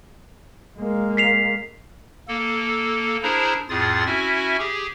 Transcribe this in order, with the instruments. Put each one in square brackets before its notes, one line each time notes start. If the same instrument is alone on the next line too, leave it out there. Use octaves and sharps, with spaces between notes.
[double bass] G#3 A#3
[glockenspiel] B6 C7 F7
[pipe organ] A#3 A4
D4 E4 G#4 A#4 C5 A#5
F2 A2 F4 G#4 D#6 A6
C#4 E4 F#4 E5 G#5
G4 G#4